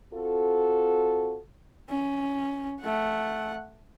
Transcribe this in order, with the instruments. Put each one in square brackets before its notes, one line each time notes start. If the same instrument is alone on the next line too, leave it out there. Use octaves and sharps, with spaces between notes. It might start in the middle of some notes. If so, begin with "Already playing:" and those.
[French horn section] C4 F4 F#4 A4
[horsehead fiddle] C#4
A3 F#5